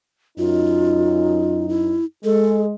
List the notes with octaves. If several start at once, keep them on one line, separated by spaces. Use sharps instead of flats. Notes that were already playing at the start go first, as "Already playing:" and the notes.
F#2 D#4 F4
E4
G#3 A4